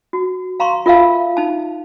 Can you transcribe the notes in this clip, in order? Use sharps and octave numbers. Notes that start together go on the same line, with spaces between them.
F#4
F5 A#5 C6 C#6
F4 A#4 E5 F5 A5
D#4 A5